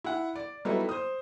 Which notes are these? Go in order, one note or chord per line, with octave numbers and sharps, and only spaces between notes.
E4 F#5
D5
F#3 G3 A3 B3 D#4 E4
C5 D#6